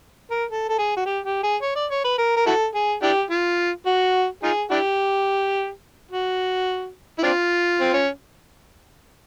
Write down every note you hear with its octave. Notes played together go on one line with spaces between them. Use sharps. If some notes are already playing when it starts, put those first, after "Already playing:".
A#4
A4
A4
G#4
F#4
G4
G4
G#4
C#5
D5
C#5
B4
A#4
A#4
E4 F#4 A4
G#4
D4 E4 G4
F4
F#4
D#4 F4 G#4
D4 E4 G4
F#4
E4
C4 D4 F4
C4
C#4